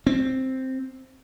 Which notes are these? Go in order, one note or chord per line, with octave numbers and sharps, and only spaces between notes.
C4